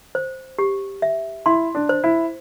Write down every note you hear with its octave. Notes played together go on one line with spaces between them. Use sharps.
C5
G4
E5
E4 C6
D4
C5
E4